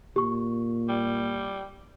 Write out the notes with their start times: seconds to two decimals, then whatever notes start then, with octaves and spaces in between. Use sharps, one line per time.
0.16 A#2 G4 C#6
0.89 G3